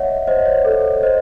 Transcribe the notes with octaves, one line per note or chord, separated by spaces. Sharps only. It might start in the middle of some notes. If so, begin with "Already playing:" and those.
Already playing: C#5 D#5 E5 F#5
C5 D#5
C#5
A4
C5 D#5